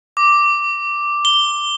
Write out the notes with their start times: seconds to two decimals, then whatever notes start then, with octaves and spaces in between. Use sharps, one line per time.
0.17 D6
1.25 G7